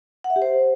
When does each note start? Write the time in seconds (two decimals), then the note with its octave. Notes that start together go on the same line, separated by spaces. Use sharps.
0.24 F#5
0.30 E5
0.36 G4
0.42 C5